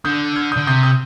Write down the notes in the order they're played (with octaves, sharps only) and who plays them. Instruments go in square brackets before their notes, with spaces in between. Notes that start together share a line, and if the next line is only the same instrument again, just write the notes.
[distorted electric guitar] D3 [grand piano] D#6 G6
[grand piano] F6 G#6
D#6 G6
[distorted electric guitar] D3
[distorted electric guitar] C3 [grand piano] D#6 G6
[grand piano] D#6 G6